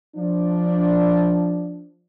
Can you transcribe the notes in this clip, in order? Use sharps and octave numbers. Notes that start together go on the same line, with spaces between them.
F3 D4